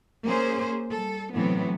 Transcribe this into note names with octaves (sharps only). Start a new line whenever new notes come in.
A#3 C#4 G#4 C5
G3 A4
A2 C3 E3 F#3 B3